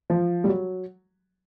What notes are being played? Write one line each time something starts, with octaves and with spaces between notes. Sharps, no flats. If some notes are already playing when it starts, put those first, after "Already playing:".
F3
G3
F#3